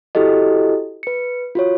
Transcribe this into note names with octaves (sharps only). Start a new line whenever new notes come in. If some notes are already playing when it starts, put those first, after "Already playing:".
E4 F#4 G4 A4 D#5
B4 C#7
F4 F#4 C#5